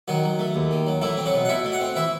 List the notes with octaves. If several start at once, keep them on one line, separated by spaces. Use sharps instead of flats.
D#3 F#3 F#4
F#3
A3
D#2
D#3
F#3
E3 A3 E4
C4
F#3 F#4
B2
F#5
B2 E4 E5
A3
F#4 F#5
C4
E3 E4 E5